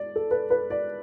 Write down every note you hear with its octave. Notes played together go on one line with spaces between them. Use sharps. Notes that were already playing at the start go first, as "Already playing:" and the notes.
Already playing: D5
A4
B4
B4
D5